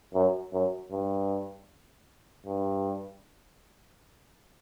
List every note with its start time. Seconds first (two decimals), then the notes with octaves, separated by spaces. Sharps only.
0.14 F#2
0.53 F#2
0.91 G2
2.46 G2